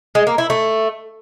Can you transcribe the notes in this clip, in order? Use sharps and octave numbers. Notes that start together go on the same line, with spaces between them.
G#3
A#3
E4
A3